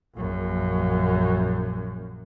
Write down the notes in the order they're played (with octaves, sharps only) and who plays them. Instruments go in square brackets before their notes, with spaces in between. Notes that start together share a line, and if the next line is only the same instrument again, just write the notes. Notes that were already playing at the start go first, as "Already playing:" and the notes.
[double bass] A#1 F#2